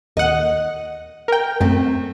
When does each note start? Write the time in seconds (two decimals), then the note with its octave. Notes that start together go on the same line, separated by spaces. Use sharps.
0.17 D#2 D#5 F#5
1.28 A#4 G5
1.61 F#2 A3 C4